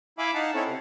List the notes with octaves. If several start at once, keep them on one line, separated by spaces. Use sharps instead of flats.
E4 E5 F5 G#5 B5 D6
D#4 F5 F#5 A5
C4 C#4 E4 A4 C#5
C3